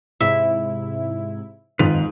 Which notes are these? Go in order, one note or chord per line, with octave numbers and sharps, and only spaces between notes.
G#2 C3 E4 E5
F2 G#2 D#3 F4 B4 F7